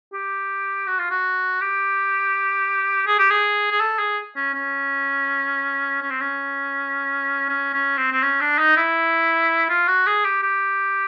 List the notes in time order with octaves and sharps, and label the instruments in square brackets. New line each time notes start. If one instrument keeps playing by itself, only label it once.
[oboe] G4
F#4
F4
F#4
G4
G#4
G4
G#4
G#4
A4
G#4
C#4
C#4
C#4
C4
C#4
C#4
C#4
C4
C4
C#4
D4
D#4
E4
F4
F#4
G#4
G4
G4